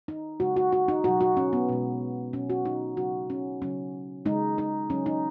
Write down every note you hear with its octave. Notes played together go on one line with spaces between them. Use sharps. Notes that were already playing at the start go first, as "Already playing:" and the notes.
D#4
C#3 G#3 F#4
F#4
F#4
D#4
B2 F#3 F#4
F#4
C#4
B3
B2 G#3
B2 F#3 C#4
F#4
D#4
C#3 F#3 F#4
C#4
C#3 F#3 C#4
C#3 G#3 D#4
D#4
C#3 F#3 C#4
D#4